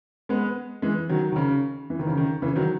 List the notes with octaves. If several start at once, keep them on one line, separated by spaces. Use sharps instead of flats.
G#3 B3
E3 G#3
D#3 F#3
D#3
C#3
E3
D#3
C#3
D#3
C#3 E3
D#3 F#3